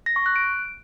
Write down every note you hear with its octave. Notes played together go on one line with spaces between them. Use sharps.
A#6
C#6
F#6
D7